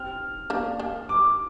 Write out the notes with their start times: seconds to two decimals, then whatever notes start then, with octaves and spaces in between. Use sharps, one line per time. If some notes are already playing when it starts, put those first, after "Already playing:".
Already playing: C4 F6
0.50 A#3 D4
0.80 A#3 D4
1.09 D6